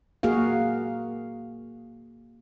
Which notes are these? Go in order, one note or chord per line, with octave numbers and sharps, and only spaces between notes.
A#3 F#4 G#4 F5